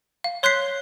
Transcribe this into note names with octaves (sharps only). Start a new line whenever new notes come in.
F5
C#5 C6 F#6 G6 B6 C7